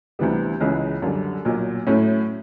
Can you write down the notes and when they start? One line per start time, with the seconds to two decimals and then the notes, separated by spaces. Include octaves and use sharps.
0.19 D2 C3 E3 G3 B3
0.60 C#2 C#3 E3 G#3 C#4
1.02 F#2 D3 G3
1.45 B1 A#2 F#3
1.87 A2 F#3 A3 C#4 E4